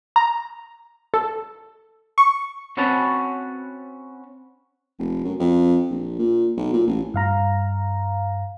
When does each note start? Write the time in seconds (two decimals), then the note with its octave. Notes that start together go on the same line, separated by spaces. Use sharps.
0.16 A#5
1.14 A4
2.18 C#6
2.77 C4 C#4 F#4 B4 C#5 A5
4.99 F1
5.24 F#2
5.40 F2
5.91 A#1
6.19 A#2
6.57 B1
6.73 A#2
6.87 A1
7.14 G2 F5 A#5